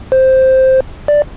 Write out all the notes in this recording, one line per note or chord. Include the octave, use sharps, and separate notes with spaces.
C5
D5